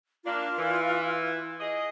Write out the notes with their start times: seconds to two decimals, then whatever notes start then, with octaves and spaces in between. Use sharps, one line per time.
0.24 A#3 D4 F4
0.57 E3
1.60 G#4 D#5